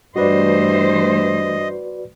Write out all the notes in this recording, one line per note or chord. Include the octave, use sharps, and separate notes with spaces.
G2 E3 A3 F#4 B4 C5 D5 D#5